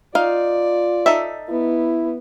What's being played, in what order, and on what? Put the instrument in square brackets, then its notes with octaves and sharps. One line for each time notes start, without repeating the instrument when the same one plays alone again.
[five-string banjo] D#4 F5 [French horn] F4 [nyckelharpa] D5
[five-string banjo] D#4 A4 E5
[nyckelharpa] B3 [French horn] E4